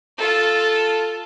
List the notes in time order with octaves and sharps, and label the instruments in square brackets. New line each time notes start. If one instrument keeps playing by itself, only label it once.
[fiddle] F4 A4